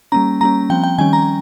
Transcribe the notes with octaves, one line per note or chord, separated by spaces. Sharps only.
G3 A#3 C#4 A#5
G3 A#3 C#4 A#5
F3 C4 G5
G5
D#3 G3 C#4 G#5
A#5